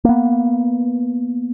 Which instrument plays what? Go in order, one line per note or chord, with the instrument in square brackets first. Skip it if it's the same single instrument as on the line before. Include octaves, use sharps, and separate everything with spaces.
[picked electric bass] A#3 B3